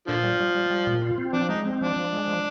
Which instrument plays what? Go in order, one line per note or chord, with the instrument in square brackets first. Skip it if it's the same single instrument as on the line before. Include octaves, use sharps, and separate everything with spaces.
[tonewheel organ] A#2 [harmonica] D3 F3
[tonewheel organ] G3
G3
G3
G3
A#2
F4
C4
[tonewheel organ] F3 [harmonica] D4
[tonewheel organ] G#3 [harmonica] D#4
[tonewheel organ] C4
[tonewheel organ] F3 [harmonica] D4
[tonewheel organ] F3
G#3
F3